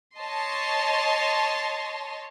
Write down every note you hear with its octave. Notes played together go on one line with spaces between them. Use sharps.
C#5 D#5 A5 C6